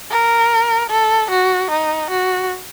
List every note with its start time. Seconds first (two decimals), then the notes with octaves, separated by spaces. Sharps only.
0.11 A#4
0.89 A4
1.31 F#4
1.70 D#4
2.10 F#4